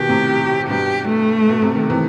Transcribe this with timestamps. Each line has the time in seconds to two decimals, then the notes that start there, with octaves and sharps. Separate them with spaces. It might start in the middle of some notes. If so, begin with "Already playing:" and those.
Already playing: B2 D#3 G4
0.09 A2 C3
0.69 G2 B2 G4
1.09 A3
1.49 B2
1.62 C3
1.75 D#3
1.90 C3 E3